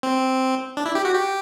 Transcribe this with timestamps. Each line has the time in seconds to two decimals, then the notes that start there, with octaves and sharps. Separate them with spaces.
0.03 C4
0.77 D4
0.86 E4
0.95 G4
1.05 F#4
1.14 G4